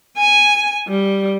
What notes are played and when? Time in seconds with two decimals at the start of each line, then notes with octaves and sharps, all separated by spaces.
0.17 G#5
0.88 G3